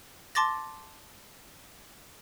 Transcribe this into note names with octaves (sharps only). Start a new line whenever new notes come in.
A5 C6 D6 A6 A#6